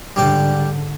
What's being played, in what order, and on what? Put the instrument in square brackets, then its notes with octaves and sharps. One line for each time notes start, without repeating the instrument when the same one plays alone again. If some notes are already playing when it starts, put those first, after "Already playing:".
[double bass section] G#2 D3 [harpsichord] G3 G4 G5